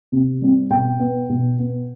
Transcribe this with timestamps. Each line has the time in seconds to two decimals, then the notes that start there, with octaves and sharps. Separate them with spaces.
0.12 C3
0.42 G3 C4
0.70 B2 G5
1.00 B3
1.29 B2
1.59 B3